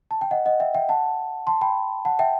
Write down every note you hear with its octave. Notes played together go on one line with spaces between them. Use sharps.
A5
G5
D#5 F#5
D#5 F#5
E5 G5
E5 G5
F#5 A5
A5 C6
G5 B5
F#5 A5
E5 G5